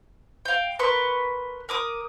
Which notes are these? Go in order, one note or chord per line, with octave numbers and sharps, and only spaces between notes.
F5 G5
A#4 B4 C6 C#6
A#4 D6 D#6